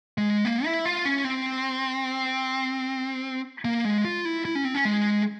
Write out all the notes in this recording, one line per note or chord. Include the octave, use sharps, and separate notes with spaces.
G#3
A#3
E4
F4
C#4
C4
A#3
G#3
F4
E4
E4
C#4
C4
C#4
G#3